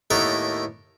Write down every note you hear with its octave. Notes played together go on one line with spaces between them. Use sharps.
D#2 A2 B3 A4 A#4 A#5